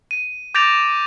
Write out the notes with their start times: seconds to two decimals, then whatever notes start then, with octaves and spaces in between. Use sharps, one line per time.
0.11 D#7
0.54 D6 G6 A6 A#6 D7 F7